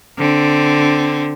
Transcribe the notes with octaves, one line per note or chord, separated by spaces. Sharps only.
D3 C4